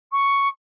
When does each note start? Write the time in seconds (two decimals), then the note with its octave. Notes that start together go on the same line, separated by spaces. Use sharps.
0.12 C#6